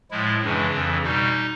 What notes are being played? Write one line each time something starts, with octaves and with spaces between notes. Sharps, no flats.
A2 F3 G#3 E4
F#2 C#3 E3 G#3 D4
F2 C#3 E3
B2 G3 D#4